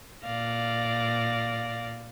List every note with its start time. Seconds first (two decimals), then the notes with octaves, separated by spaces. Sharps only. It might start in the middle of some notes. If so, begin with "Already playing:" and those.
0.23 A#2 D5 F5 A#6